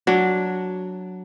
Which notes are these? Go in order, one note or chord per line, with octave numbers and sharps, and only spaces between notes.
F#3 D4